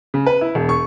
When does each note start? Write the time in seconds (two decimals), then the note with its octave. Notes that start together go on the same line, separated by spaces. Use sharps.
0.14 C#3
0.26 B4
0.41 E4
0.55 E1
0.69 C#6